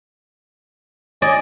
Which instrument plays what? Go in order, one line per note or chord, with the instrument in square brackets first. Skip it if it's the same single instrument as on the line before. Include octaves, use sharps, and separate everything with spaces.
[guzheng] D5 [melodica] D#5 G#5